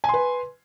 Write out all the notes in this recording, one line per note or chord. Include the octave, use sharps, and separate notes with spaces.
B4 G#5 C6